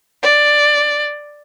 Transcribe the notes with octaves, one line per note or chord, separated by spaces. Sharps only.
D5